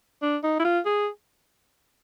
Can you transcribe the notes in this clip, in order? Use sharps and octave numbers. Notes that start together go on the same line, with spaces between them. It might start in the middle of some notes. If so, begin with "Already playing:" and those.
D4
D#4
E4
F4
G#4